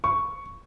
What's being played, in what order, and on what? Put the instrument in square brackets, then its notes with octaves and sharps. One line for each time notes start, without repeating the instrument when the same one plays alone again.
[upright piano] C#6